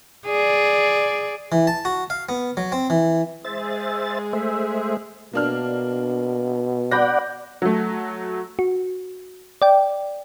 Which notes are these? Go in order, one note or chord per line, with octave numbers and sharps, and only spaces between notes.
G#4 D5
E3
A5
F#4
F5
B3
F#3
C4
E3
G#3 G#4 C5 E5 A6
A3 C5 E5
B2 A#3 D4 F6
D5 F#5 B5 G6 A#6
F#3 A3
F#4
D5 G5